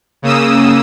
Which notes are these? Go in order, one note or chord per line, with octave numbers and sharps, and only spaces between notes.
C#3 A#3 D#6 E6